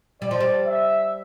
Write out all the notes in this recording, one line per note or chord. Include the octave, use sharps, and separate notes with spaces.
G3 D5
F3
G3
E5